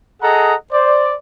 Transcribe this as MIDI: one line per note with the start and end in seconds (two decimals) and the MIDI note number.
0.23 0.55 68
0.23 0.55 69
0.23 0.55 75
0.23 0.55 78
0.23 0.55 82
0.73 1.14 72
0.73 1.14 74